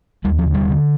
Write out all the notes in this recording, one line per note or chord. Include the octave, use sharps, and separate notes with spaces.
D#2 G3
F3
D3
G3
D3